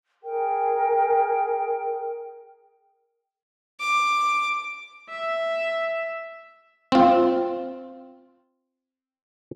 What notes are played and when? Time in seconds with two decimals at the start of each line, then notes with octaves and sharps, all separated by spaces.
0.23 G#4 A#4 G5
3.80 D6
5.09 E5
6.92 C4 F4